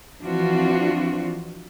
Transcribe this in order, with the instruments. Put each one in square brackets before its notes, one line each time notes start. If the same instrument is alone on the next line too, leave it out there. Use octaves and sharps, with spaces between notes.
[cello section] E3 F3 C4 D4 F4 F#4